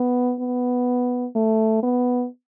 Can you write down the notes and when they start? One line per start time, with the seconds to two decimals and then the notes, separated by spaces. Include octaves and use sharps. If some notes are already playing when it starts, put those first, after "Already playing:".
Already playing: B3
0.40 B3
1.36 A3
1.83 B3